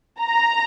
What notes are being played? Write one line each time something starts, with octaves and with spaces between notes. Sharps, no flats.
A#5